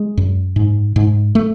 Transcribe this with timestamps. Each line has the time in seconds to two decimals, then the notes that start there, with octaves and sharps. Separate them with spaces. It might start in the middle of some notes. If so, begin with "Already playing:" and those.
Already playing: G#3
0.17 F#2
0.56 G#2
0.96 G#2
1.35 A3